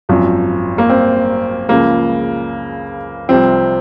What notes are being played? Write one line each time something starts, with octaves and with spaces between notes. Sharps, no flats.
G#1 F#2 F3
A#3
C4
C#2 C#3 F3 A#3
C2 C3 F3 C4